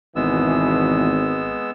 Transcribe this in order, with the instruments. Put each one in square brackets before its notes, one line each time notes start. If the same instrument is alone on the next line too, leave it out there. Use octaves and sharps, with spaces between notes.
[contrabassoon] G#1 [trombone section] E2 B2 E3 [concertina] G#3 B3 E6